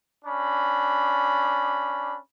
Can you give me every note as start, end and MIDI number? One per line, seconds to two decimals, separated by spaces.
0.25 2.17 61
0.25 2.17 62
0.25 2.17 83